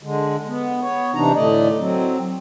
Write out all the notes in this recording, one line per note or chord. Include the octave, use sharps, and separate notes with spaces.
D3 G#3
B3
B3 C#5
C3 E3 D4 D#4 A#5
A2 D3 A3 D5 D#5
F#3 C4